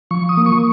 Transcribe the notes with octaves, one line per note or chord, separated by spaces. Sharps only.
F3 C#6
D#6
A#3
C#6